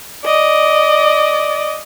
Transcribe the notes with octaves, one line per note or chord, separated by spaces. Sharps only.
D5 D#5